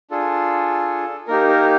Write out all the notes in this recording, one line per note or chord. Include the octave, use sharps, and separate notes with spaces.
D4 F4 G#4 A4
A#3 D#4 G4 A#4
A#4